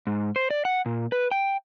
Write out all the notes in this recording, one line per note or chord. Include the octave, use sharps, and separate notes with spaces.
G#2
C5
D5
F#5
A#2
B4
G5